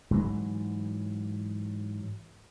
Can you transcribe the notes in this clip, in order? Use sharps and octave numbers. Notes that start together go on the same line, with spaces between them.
G#2 E3 F#3